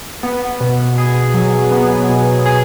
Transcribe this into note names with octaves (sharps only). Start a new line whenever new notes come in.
B3
B2
G#4
F#3
B3
B2
G#4